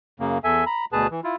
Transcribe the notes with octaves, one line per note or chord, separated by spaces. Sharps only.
F#2 C#3 A#3
E2 A4 E5 G#5
A#5 B5
D2 B2 G#4 B4 A5
E3
E4 F4